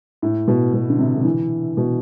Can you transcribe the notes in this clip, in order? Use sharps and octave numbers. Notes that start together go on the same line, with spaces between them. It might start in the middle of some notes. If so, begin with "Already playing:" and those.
A2
B2
B2
D3
C3
D3
E3
B2